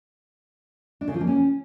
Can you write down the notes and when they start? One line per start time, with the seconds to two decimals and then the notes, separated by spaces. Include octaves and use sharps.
1.01 D4
1.08 C#3
1.14 F3
1.21 A#3
1.27 C#4